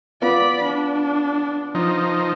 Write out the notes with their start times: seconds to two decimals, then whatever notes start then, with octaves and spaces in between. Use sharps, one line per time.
0.22 B3 F4 D5 B5
0.65 D4
1.75 F3 D#4